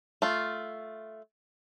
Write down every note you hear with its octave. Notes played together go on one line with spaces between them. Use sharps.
A3 F4